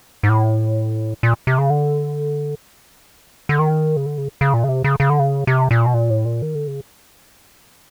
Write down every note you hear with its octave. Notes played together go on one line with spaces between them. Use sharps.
G#2
A2
A#2
C3
C#3
D3
D3
D#3
C#3
D3
C#3
C#3
A#2
C#3
C3
C#3
C#3
D3
C#3
C3
A#2
B2
A#2
A2
A#2
D#3
D3
C#3